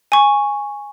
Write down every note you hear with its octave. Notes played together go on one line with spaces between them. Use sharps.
G#5 C#6